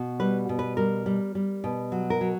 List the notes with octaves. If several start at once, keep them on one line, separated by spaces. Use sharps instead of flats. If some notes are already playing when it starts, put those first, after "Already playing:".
Already playing: B2
G3 B4
B2
B4
G3 A#4
G3
G3
B2
F#3
A#4
F#3